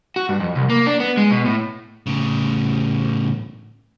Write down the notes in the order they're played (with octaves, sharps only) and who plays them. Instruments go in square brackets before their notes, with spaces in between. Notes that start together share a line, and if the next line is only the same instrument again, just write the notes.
[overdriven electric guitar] F#4
G2
F2
C2
A#3
D4
B3
G#3
B2
A2
A2 C#3